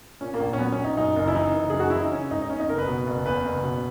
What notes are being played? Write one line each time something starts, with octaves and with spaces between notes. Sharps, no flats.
A#2 C#4
A#3
A#1
C#4
F#3 B3
C#4
A#1
D#4
F#2 D#4
F#1
E4
E3 D#4
F#1
F#2 G#4
F#4
E3 E4
D#4
C#3 C#4
G#1 D#4
D#4
E2 C#4
D#4
F#1 A#4
B4
B2
F#1
E2 B4
F#1
B2